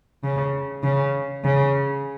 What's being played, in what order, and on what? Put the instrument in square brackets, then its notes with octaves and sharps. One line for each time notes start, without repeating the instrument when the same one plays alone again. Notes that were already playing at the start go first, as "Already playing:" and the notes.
[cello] C#3
C#3
C#3